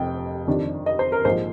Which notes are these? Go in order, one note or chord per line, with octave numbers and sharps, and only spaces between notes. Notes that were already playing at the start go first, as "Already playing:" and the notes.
Already playing: F1 F2 C3 G5
F2 C3 D#3 G3 D4
D#5
C5
A#4
A#1 G#2 F3 C5